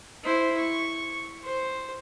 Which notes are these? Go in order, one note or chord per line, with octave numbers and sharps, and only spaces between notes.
E4 C5
C#6
C5